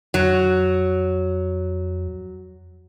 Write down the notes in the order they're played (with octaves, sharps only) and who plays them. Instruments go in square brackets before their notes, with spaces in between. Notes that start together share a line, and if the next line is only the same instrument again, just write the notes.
[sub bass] F2 [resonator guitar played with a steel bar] F#3